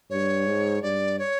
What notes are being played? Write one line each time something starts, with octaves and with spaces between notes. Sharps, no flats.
G2 C#5
G#2
G2 D5
C#5